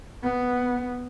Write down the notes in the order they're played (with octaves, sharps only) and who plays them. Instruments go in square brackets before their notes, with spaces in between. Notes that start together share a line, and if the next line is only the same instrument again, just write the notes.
[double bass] B3